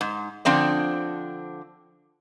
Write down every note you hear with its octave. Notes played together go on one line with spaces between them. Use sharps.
G#2
D3 F3 C4 D4